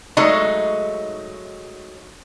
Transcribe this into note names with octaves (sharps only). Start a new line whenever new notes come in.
F#3 G#3 A3 D#4